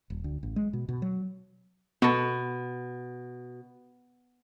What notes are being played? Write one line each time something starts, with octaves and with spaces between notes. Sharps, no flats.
D#1
D2
A1
G#3
B2
B2
F#3
B2 B3 A4